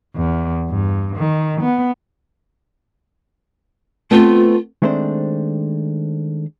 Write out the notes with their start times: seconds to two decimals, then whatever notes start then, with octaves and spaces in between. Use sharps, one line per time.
0.16 E2
0.70 G2
1.16 D#3
1.61 B3
4.11 A3 B3 C4 F4
4.82 D#3 G#3 A3 C4 D4 C5